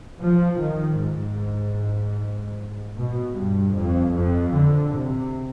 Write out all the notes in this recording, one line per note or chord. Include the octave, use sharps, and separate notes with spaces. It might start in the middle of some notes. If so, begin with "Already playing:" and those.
F3
D#3
G#2
B2
G2
F2
F2
D3
C3